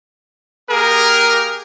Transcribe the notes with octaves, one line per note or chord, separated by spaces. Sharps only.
A#3 G4 G#4 A#4